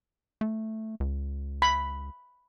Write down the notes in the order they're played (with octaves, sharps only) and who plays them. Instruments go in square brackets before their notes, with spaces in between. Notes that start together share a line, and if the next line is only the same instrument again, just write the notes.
[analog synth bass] A3
C#2
[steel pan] B5